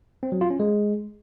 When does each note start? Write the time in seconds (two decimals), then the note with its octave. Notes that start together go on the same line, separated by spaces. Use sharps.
0.23 C4
0.32 F#3
0.41 F4
0.50 C#4
0.60 G#3